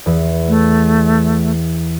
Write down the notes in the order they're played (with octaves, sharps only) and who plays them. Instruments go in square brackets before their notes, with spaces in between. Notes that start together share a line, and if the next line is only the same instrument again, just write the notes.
[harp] E2
[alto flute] A3